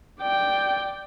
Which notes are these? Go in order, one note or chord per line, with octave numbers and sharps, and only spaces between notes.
D5 G5